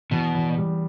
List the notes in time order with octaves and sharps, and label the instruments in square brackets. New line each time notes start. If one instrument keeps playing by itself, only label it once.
[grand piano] E2 [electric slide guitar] B2
[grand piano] E2
G3